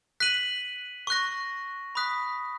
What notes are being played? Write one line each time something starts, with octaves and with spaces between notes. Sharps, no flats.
F#6 B6 D#7 F#7
C#6 F#6 A#6
B5 D#6 F#6 B6